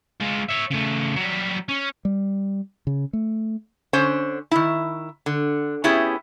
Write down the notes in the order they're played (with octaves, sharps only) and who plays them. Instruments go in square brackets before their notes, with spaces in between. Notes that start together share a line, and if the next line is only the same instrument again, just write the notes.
[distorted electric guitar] G#3 F4
C#5 E5
C#3 A3
F#3 G3
C#4
[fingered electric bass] G3
C#3
A3
[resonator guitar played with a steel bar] D3 C#4 C5
D#3 E4
D3
B3 C#4 E4 G4 G#4